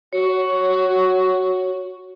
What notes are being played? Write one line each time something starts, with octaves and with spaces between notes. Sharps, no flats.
F#4 C#5